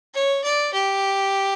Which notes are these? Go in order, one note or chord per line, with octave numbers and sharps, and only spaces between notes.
C#5
D5
G4